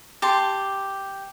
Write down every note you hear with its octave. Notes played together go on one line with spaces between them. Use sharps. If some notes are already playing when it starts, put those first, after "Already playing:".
G4 A5 C6